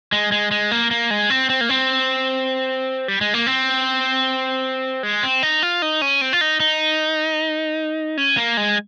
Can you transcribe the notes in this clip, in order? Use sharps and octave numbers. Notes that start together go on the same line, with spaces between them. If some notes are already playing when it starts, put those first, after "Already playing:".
G#3
G#3
G#3
A#3
A#3
G#3
C4
C4
A#3
C4
G3
G#3
A#3
C4
G#3
C4
D#4
F4
D#4
C#4
C4
F4
D#4
D#4
C#4
A#3
G#3